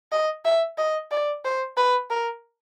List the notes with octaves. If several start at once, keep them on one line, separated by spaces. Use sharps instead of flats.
D#5
E5
D#5
D5
C5
B4
A#4